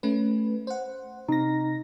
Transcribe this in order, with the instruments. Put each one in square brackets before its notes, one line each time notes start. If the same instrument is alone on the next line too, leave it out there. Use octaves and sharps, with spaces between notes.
[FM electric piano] A3 C#4 B4
C5 F#5
[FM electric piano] C3 A#6 [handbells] D#4